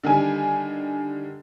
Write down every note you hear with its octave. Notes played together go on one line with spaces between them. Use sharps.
D3 D#3 G3 G#5